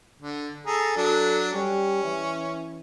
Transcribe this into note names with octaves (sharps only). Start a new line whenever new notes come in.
D3
G#4 A4 A#5
F#3 D4 A4
G3 C#4
E3